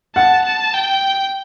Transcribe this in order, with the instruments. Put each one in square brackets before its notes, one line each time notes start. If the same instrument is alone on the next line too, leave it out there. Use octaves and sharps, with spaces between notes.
[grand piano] F#5 [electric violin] A5
[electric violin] A5
G5